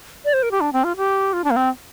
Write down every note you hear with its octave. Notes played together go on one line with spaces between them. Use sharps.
D5
C5
A#4
G4
D4
C4
F4
G4
F4
D4
A#3
C4